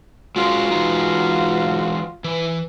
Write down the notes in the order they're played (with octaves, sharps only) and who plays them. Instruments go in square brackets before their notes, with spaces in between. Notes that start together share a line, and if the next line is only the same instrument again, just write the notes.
[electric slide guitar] G#3 C#4 A#4 [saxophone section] F4 F#4
[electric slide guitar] E3 G#3 D#4
E3